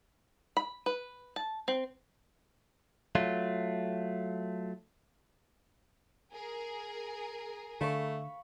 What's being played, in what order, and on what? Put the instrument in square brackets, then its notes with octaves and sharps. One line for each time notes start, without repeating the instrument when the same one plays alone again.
[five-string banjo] B5
B4
A5
C4
[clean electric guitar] F#3 A3 F4
[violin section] G#4 A#4
[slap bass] D3 [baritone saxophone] A3 [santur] F5 B5 C#6